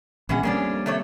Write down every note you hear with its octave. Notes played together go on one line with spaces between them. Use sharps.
A#1 B2 E3 G#3 C#4 F#5
F2 G3 A#3 C#4 D4
C3 A3 C#5